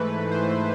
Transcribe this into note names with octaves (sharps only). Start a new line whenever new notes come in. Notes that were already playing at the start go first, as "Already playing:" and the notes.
Already playing: G#2 E3 A3 B4
C5